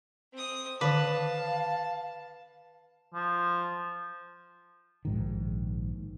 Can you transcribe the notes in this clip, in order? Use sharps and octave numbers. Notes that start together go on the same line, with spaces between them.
C4 D#6
D3 D#3 B4 F5 A5
F3
A#1 G#2 D#3